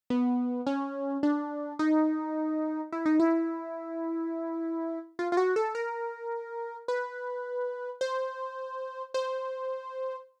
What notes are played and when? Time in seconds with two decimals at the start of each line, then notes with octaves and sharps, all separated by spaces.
0.10 B3
0.67 C#4
1.23 D4
1.79 D#4
2.92 E4
3.06 D#4
3.20 E4
5.19 F4
5.32 F4
5.37 F#4
5.56 A4
5.75 A#4
6.88 B4
8.01 C5
9.14 C5